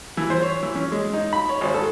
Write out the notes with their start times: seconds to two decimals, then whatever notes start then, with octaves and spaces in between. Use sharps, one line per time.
0.17 E3
0.30 C5
0.43 C#5
0.63 E3
0.75 C#4
0.92 G#3
1.14 D#4
1.33 B5
1.49 C#5
1.61 G#1
1.74 A4